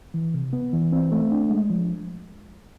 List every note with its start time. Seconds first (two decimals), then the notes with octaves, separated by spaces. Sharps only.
0.14 E3
0.34 C3
0.53 B3
0.73 E3
0.92 C4
1.12 A3
1.32 D4
1.50 G#3
1.70 F3